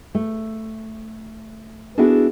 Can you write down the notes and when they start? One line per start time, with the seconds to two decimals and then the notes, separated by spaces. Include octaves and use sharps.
0.15 A3
1.98 B3 D4 E4 F#4 G#4 A4